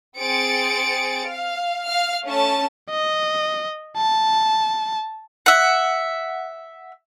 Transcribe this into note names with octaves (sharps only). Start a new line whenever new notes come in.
C4 G#4 A6 C#7 D7
F5
F5 F6
A3 C#4 A5
D#5
A5
E5 F#5